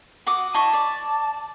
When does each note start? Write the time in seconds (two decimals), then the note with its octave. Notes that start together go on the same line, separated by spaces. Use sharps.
0.26 F#4 D6 D#6
0.54 E4 D#5 A5 C#6
0.73 D5